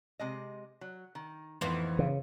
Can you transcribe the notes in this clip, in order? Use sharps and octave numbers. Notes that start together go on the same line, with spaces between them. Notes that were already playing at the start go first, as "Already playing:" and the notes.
C3 G#3 D#5
F#3
D#3
F2 A2 D#3 E3 B3 C5
C#3